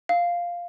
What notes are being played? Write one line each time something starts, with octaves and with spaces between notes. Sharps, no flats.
F5